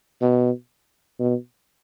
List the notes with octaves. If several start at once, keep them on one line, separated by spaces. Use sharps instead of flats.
B2
B2